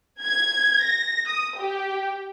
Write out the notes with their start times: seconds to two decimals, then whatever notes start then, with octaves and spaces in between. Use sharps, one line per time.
0.21 G#6
0.82 A#6
1.28 D#6
1.58 G4